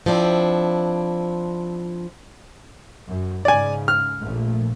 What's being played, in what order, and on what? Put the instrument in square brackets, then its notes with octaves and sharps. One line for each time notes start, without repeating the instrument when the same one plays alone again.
[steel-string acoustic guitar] F3 C4 D4 E4
[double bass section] F#2
[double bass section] G#2 C#3 [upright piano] D5 G#5
[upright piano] F6
[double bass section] A#1 A#2 A3